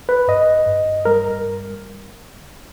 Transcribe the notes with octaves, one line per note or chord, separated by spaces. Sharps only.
B4
G2 D#5
G2
G3 A#4